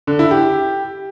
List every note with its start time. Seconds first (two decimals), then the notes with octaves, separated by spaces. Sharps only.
0.07 D3
0.19 E4
0.31 G4